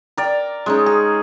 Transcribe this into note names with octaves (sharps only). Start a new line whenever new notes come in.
A#4 D5 G5
G#3 C#4 D#4
G#4